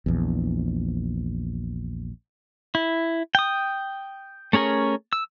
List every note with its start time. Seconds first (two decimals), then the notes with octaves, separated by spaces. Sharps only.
0.06 A#1 E2
2.75 E4
3.35 G5 D#6
4.53 A3 C#4 G#4 A#4 C#5
5.13 E6